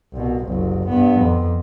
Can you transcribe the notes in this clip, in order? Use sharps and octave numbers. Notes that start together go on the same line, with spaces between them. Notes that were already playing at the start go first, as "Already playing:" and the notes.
C2 B2
F#1 C2
G2 B3
F2